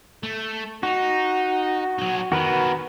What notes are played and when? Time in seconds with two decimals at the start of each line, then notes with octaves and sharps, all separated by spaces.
0.23 A3
0.83 D#4 F#4
1.99 F#3 D#4
2.32 D#3 B3 F#4 A#4 B4